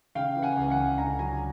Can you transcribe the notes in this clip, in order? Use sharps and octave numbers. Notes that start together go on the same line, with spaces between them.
C#3 F5 G5
E3
F#5 G#5
C#2
F#5 G#5
C#2
D3 G#5 A#5
F#3 G#5 A#5